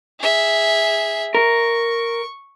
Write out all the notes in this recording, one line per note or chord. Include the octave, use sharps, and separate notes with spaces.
G#4 E5
A#4 C#6